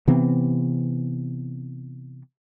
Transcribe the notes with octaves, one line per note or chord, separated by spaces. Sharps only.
C3 E3 B3 C4